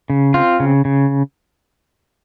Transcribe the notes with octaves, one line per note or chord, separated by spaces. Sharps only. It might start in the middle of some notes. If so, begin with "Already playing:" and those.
C#3
C4 F4
C#3
C#3